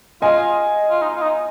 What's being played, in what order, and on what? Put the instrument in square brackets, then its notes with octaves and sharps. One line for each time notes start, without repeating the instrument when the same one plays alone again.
[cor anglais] F4 [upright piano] D#5 G#5
[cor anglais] F4
D#4
F4
D#4